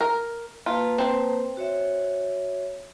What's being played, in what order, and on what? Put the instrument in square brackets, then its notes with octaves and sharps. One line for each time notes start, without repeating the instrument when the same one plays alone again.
[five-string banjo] A#4
[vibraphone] A#3 B4 A5 [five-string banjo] F4
[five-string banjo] C4 C5
[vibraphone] F#4 C#5 E5